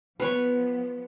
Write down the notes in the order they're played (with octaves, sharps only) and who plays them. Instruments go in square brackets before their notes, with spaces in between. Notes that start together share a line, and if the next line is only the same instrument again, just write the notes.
[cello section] F3 B3 [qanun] B4 C#5